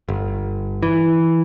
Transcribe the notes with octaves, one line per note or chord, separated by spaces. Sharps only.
G1
E3